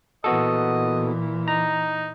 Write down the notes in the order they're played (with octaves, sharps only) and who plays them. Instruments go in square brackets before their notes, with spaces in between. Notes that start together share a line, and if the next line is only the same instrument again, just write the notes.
[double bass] A#2 E3 [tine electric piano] B3 F#4 A4 [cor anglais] D#5
[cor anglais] D#4 [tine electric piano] A#5